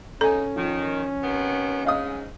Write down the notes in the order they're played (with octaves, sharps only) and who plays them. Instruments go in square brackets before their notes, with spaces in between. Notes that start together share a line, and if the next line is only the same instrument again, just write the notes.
[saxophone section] F#2 C#3 D#4 [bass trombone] C#4 [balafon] A4 [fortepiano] G#5 A#5
[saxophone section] D#3 [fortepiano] F3
[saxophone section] C3 D#3 B3
[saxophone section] G#2 [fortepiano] D#5 F5 D#6